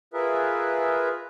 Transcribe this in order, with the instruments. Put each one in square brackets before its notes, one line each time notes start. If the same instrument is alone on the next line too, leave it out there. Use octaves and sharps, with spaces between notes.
[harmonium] F4 G#4 A#4 B4 E5